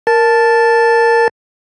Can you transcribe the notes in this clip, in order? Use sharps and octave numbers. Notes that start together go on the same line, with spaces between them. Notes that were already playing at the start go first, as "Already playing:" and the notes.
A#4 A5 A6